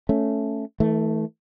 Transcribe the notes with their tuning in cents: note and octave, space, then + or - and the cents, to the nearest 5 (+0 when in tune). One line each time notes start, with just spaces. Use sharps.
A3 +0 C#4 +0
E3 -35 A3 +0